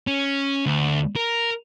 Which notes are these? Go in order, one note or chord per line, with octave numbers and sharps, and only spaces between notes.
C#4
D2
A#4